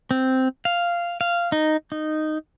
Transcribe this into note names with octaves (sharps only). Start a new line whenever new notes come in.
C4
F5
F5
D#4
D#4